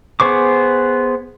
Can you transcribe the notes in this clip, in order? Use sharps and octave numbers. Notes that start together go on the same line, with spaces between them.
B3 G#4 C5 C#6 D6